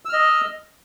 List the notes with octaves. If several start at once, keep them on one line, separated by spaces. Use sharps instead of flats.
D#5 E6 F6